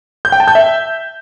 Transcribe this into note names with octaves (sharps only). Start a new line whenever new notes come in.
G6
G5
A5
G6
E5